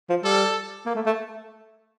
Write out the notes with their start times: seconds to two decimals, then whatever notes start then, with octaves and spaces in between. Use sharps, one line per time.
0.09 F3
0.24 G3 A4
0.86 A#3
0.95 A3
1.06 A3